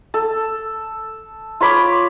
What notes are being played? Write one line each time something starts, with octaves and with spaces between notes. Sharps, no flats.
A4
F4 C#5 B5 D6